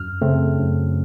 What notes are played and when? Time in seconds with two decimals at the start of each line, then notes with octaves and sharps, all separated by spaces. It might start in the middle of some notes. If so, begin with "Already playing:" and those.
Already playing: F#2 F6
0.22 C#3 A3 C4
0.59 F#2